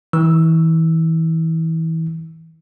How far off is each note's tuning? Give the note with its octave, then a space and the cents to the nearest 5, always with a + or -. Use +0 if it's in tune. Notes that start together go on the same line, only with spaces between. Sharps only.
E3 -30 E6 +0